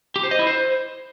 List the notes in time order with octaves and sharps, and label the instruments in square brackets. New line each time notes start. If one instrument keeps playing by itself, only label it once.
[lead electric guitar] G4
C5
D#5
E4
C5